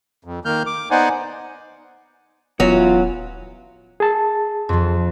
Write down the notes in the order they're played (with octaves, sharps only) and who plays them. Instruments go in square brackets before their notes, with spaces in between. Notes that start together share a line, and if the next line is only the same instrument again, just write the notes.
[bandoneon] F2
D#3 A#3 F6 G6
D6
B3 D#4 C5 D5 F#5 G#5
[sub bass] D#1 [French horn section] E3 F4 [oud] F#3 [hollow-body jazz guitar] B3 C#4 F#4
[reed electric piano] G#4 A5
[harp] F2 F3